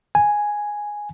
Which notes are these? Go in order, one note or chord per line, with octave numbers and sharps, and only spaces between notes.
G#5